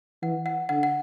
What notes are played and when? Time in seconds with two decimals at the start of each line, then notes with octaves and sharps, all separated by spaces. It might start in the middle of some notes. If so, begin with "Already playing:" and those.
0.22 E3 F#5
0.46 F#5
0.69 D3 F#5
0.83 F#5